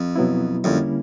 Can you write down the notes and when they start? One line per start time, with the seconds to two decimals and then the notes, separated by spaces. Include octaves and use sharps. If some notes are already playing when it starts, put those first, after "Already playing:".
Already playing: F2
0.16 B2 F#3 B3 E4
0.64 F2 D3 G3 A#3 C#4 E4